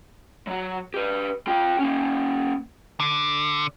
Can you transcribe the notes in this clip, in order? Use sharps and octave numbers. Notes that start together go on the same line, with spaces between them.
F#3 F#4
G4 B4
F4 G5
A#3 C#4
D3